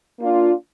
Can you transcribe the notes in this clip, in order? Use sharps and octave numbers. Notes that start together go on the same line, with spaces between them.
A#3 D4 F4